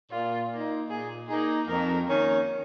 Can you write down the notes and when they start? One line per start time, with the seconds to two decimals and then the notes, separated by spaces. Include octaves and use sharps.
0.11 A#2 F4
0.50 A#3
0.55 D#4
0.89 A#2 G#4
1.28 A#3 D#4 G#4
1.68 F2 A#4
2.07 D#3 A#3 C#4